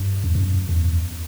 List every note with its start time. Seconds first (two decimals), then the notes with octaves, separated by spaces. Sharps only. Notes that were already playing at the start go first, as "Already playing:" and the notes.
Already playing: G2
0.24 E2
0.35 F#2
0.69 E2